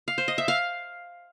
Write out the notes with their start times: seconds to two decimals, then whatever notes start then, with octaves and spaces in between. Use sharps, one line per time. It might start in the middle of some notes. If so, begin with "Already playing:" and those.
0.08 F5
0.18 C5
0.28 D#5
0.38 E5
0.48 F5